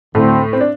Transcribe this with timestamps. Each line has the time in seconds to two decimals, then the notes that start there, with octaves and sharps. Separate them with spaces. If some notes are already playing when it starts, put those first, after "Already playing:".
0.15 D2 A2 D3 A3 C4
0.53 C4
0.61 D4